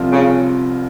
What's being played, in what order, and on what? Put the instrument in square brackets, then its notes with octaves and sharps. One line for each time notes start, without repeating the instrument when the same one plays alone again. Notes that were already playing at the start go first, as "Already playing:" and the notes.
Already playing: [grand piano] C2 C3 F3 C4 F4
[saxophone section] C#3